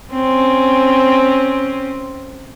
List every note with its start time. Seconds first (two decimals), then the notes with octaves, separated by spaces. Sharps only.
0.12 C4 C#4